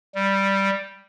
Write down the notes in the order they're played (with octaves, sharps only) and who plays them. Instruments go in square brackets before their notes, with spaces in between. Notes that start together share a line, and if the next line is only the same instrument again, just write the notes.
[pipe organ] G3